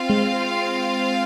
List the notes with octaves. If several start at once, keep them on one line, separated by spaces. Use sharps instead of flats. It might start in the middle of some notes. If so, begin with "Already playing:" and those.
Already playing: C4 F4 C5 F5
G#3